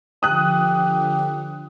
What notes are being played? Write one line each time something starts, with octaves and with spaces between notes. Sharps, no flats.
D3 F3 G4 D#6 F#6